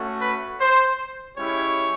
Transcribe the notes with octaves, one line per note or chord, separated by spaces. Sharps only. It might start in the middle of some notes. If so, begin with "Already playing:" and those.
Already playing: A3 C#4 F#4
B4
C5
G#3 C#4 E4 G4 C#5